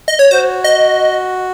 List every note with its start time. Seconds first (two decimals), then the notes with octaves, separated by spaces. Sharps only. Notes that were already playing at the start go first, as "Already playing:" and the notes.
0.08 D#5
0.19 C#5
0.31 F#4 C5
0.64 D#5